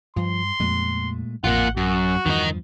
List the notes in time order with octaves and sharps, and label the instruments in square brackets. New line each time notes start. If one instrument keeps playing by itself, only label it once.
[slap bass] G2 [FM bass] F3 [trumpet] C6
[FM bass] F2 [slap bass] A#2 G#3 A3
[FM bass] A1 [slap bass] F2 [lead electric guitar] A#3 F4 [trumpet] F#5
[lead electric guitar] F#2 [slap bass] F#3 [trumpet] F#4
[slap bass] E2 G2 F3 [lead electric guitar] D#3 D#4